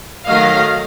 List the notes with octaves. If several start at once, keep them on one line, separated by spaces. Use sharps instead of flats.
D#3 F#3 A3 D#5 F5